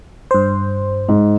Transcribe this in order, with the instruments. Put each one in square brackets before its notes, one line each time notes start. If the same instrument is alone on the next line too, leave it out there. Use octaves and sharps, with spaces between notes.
[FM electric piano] G2 C5
[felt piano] G#2